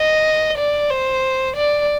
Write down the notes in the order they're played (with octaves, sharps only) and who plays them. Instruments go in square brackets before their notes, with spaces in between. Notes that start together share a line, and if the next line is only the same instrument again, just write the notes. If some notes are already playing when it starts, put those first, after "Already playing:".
Already playing: [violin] D#5
D5
C5
D5